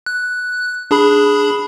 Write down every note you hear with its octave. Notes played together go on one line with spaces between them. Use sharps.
F#6
D4 G#4 B5